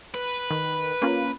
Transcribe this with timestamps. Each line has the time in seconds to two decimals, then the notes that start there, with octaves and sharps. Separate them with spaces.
0.15 B4
0.51 D#3
1.02 A#3 C#4 F4